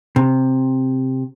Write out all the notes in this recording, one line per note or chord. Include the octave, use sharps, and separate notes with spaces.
C3